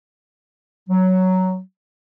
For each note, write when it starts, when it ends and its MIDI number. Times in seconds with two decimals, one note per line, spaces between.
0.88 1.59 54